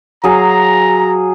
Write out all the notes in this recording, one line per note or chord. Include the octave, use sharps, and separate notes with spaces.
F#3 G#4 F5 A#5